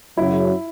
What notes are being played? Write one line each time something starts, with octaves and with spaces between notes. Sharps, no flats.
F#2 C#3 F#3 E4